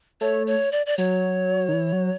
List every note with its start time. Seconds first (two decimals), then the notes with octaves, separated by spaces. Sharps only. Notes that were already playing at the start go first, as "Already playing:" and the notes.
0.21 A3 C#5
0.47 C#5
0.72 D5
0.86 D5
0.98 F#3 C#5
1.69 D#3
1.73 E3
1.93 F#3